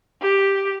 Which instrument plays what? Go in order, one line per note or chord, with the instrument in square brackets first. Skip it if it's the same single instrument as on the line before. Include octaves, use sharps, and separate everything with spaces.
[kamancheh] G4